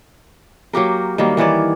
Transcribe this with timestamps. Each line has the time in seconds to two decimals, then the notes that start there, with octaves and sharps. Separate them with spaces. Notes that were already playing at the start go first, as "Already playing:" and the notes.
0.73 F#3 A#3 G4 A#4
1.18 D#3 F#3 G3 A#3
1.37 D#3 E3 C#5 D5